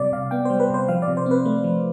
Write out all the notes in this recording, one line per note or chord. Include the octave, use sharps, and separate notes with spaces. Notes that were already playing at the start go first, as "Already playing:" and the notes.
Already playing: C3 G3 D5
C3 F5
B3 G5
G3 C5
B4
C3 C5
F3 F5
D5
C3
C5
C4 B4
A3
F3